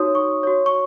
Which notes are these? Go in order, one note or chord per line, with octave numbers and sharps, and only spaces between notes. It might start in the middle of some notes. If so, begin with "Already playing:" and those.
Already playing: D#4 F#4 C#5 D#6
C#6
F#4 C#5
C#6